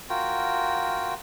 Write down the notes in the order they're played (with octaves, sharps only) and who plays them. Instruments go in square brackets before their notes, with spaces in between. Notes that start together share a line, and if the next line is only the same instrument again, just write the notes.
[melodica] F4 F#4 A#4 G5